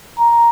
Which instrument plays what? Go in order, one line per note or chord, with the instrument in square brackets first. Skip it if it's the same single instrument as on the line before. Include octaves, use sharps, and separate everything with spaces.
[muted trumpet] A#5